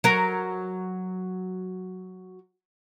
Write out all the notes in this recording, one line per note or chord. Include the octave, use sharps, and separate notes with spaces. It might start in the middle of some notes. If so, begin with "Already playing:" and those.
F#3 A#4